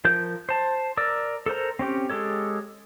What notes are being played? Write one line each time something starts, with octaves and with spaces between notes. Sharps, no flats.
F3 A#4 G6
C5 A5
A#4 D5 E6
A4 A#4 C5 A#5
C4 C#4 G4
G#3 G4 A4 C#5